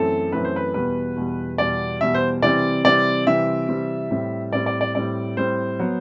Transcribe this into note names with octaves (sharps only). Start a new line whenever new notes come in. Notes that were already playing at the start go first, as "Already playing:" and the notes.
Already playing: F#2 E3 A3 C4 A4
F#2 E3 A3 C4 B4
C5
B4
E2 B2 G3 B4
E2 B2 G3
E2 B2 G3 D5
E2 B2 G3 E5
C5
C3 E3 G3 C4 D5
C3 E3 G3 C4 D5
C3 E3 G3 C4 E5
C3 E3 G3 C4
A2 G3 C4
A2 G3 C4 D5
D5
D5
A2 G3 C4 D5
A2 G3 C4 C5
F#3 B3